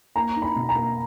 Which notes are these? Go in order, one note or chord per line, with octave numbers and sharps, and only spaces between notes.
A#3 A#5
D#4
B5
B2
A#5
A#3